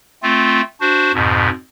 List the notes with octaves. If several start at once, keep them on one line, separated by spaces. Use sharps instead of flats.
A3 C4 F4
D4 F#4 C5
F2 G#2 B2